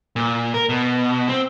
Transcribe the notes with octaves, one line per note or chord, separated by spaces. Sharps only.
A#2
A#4
B2
C4